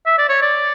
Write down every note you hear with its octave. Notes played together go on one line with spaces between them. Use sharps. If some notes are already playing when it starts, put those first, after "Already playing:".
E5
D5
C#5
D5